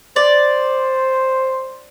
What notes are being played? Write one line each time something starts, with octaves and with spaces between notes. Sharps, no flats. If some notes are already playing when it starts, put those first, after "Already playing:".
C5 D5